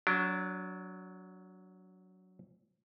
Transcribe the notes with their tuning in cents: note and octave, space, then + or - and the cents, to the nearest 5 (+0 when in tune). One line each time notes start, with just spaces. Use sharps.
F#3 +0 D4 -25